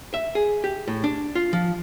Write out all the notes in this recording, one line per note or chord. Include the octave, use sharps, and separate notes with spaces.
E5
G#4
G4
A2
D4
F4
F3